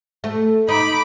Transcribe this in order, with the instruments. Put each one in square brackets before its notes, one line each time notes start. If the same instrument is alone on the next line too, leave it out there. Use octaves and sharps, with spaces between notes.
[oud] A3
[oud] D#4 [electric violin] B5 D6